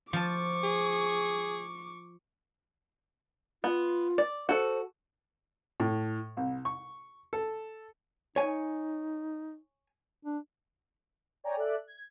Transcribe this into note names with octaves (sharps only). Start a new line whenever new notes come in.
F3 A5 C#6 D6
G#4
B3 F4
D5
F#4 A4 C5
A2
C2
C#6
A4
D#4 C#5 G#5
D4
C#5 D5 G5 G#5 A#5
A4 D5 E5 F#6
G#6